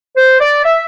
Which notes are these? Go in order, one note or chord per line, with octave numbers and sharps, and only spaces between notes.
C5
D5
E5